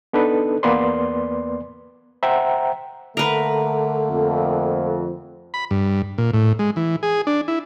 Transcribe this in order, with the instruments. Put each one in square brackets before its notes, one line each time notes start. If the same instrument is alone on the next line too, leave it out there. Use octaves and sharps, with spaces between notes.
[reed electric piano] B3 D4 D#4 A4 B4
E2 A#3 B3 B4 D5 C6
C5 E5 F#5 G5 A#5
[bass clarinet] D3 [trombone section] A3 A#3 [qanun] A#4 B4
[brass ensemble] F2
[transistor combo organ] B5
G2
A#2
A2
G#3
E3
G#4
D4
E4